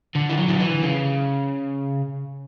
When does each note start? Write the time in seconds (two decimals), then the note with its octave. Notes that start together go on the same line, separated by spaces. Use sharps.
0.15 D3
0.29 E3
0.38 F#3
0.49 D3
0.60 E3
0.83 C#3